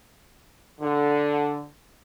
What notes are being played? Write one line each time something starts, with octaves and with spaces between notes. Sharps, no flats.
D3